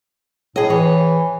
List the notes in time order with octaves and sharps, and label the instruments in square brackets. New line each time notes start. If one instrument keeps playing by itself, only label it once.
[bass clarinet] A2 [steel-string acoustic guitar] G#4 D#5
[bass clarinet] E3 [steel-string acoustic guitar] C#5